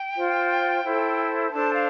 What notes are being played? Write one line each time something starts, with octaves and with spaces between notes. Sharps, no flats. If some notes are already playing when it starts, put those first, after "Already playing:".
Already playing: G5
F4 C5
E4 A4 C5
D4 A4 C5 A5
F5